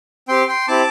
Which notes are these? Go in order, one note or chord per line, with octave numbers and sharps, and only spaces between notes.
C4 G4 G5 C6
G5 C6
C4 E4 G4 A5 D6